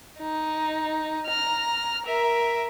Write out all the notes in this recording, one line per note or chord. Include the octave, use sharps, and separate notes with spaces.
D#4
A#5 F6
A#4 E5